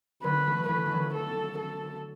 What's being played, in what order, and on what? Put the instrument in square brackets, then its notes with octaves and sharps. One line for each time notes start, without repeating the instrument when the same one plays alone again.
[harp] D3 F#3 [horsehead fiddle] B4
[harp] E3 A3
[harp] E3 A3 [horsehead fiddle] B4
[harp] E3
D3 F#3
[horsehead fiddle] A4
A4